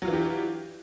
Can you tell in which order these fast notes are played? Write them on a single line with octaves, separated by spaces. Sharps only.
F#3 F4 E3 D4 G4